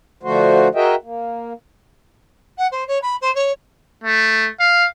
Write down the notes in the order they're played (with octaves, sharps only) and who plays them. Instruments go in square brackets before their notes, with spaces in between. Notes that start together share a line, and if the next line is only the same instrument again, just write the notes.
[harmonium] D3 F3 A3 F#4 C5
F#4 G#4 A#4 D#5 E5 G5
A#3
[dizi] F#5
C5
C#5
B5
C5
C#5
[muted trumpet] A3
F5